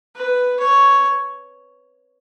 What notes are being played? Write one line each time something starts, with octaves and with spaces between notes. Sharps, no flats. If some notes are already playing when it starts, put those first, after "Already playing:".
B4
C#5